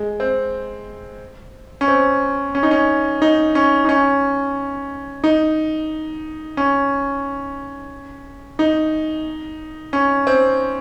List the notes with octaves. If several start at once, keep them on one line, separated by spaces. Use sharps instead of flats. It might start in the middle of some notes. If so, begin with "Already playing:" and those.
Already playing: G#3
C4
C#4
C4
C#4
D#4
C#4
D#4
C#4
D#4
C#4
D#4
C#4
D#4
C#4
C4